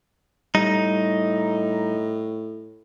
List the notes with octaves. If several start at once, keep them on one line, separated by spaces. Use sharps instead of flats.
A2 G3 D#4